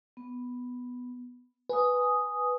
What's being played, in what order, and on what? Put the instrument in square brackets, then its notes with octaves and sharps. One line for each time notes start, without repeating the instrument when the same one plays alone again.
[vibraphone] B3
[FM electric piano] B4 [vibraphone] G#5 D#6